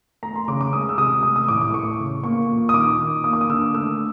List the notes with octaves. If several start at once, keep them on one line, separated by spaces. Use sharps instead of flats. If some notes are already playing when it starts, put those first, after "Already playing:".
A3 A#5
C6
C#3 D6
D6
G#3 D#6
E6
C3 D#6
A3 D#6
D#6
A2 D6
D6
A3 C#6
C#3
A#3 C#6
A#2
D#6
D#3 D6
D#3
A#3 D#6
D6
D#6
D3 E6
A3 E6